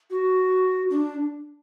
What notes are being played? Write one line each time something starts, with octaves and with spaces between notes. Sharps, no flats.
F#4
D4